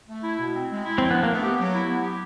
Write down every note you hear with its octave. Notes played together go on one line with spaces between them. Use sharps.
A3
E4
B2
C4
G#3
E4
F3 C4
B3 D4
A#3
A3
B3
G4
F#3
E4
B3
G4